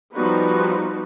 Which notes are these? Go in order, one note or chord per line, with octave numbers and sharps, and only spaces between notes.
F3 G3 B3 D#4 F#4 B4